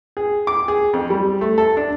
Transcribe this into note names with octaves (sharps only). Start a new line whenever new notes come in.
G#4
D6
G#4
F2
G3
A3
A4
D4